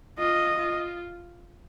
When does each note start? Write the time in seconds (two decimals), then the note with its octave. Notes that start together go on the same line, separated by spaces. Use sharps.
0.19 F4 D#5
0.58 F4